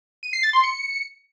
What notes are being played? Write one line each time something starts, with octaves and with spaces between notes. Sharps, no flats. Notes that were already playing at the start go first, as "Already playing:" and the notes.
D#7
C7
A6
C6
C#7